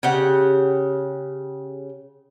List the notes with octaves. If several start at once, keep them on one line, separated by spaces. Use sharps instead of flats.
C#3 G4 F#5